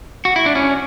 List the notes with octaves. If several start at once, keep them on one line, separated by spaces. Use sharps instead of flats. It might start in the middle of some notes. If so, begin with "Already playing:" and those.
F#4
E4
D4
C#4